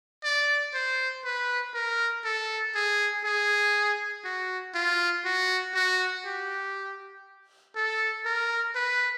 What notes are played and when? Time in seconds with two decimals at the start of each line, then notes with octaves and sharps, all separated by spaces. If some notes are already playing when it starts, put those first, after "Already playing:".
0.24 D5
0.74 C5
1.25 B4
1.74 A#4
2.25 A4
2.75 G#4
3.25 G#4
4.25 F#4
4.75 F4
5.25 F#4
5.75 F#4
6.25 G4
7.76 A4
8.26 A#4
8.75 B4